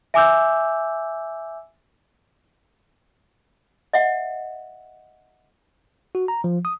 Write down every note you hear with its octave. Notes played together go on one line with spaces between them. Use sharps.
E5 G#5 D6 E6 G6
D#5 E5 F#5
F#4
A#5
F3
D#6